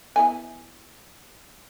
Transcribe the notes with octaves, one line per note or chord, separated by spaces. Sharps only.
B3 E4 G#5